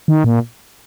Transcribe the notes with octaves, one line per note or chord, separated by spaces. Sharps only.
D#3
A#2